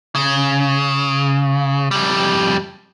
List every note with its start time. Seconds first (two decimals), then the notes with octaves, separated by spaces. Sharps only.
0.15 C#3
1.91 F2 G3